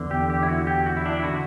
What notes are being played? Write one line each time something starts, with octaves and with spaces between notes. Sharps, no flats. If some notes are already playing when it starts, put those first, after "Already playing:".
Already playing: E2 D3
G4
G4
E4
F#4
G4
F#4
E4
D4
E4
D3 F#4